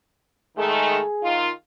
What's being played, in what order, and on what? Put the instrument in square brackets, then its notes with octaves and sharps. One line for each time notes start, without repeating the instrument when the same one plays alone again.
[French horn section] D#3 G#3 A3 [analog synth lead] G#4
[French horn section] D#3 F4